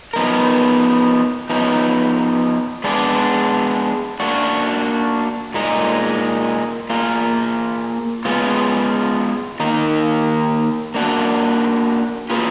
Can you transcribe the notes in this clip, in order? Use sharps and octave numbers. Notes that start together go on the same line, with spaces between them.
F3 B3 D#4 A#4
F3 B3 D#4
G#3 B3 D4 G#4 D5
A#3 D4 F#4
A#2 G#3 D#4
A#3 F4 G#4
G#3 B3 F4
D#3 A#3 D#4 A#4
A#3 D4 F#4
A#3 F4 G#4 B4